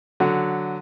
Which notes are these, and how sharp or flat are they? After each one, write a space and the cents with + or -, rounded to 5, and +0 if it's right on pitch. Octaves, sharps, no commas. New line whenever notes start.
D3 +0 F#3 +0